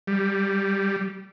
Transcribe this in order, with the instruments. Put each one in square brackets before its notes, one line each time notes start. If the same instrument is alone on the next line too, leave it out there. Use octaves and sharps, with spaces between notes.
[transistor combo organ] G3